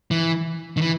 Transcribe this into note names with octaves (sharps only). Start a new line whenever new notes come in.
E3
D#3
E3